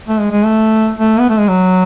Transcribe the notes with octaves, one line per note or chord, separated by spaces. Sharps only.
A3
G#3
G#3
A3
A3
B3
A3
G#3
F#3